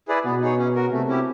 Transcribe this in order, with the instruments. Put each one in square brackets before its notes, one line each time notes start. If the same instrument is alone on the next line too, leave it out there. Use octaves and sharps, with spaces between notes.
[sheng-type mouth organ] E4 G#4 B4 D5
[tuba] B2 [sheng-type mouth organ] B3
[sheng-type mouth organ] D#4 G#4 C#5
C#4
F#4 A#4
[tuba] C3 [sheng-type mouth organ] A3
[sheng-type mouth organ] C#4 E4 G4